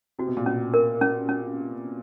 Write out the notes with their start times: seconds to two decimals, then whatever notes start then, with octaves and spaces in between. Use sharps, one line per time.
0.19 C3 F#4
0.27 B2
0.37 A#2
0.46 B2 C#4
0.74 A#4
1.01 C#4
1.29 C#4